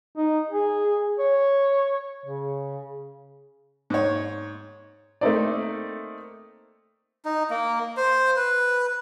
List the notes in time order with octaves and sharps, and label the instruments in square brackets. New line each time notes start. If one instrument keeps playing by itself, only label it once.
[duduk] D#4
G#4
C#5
C#3
[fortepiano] G#2 C#5
[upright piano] A3 A#3 C4 D#4 C5 D5
[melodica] D#4
A#3
C5
B4